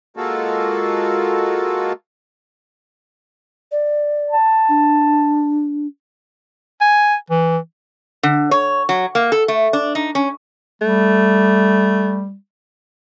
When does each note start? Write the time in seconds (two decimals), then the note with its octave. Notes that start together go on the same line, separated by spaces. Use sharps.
0.17 G#3 A#3 F4 F#4 A4
3.72 D5
4.31 A5
4.69 D4
6.81 G#5
7.30 E3
8.23 D3
8.51 C#5
8.89 F#3
9.15 A#3
9.32 A4
9.48 A3
9.73 D4
9.95 D#4
10.15 C#4
10.82 G3 A3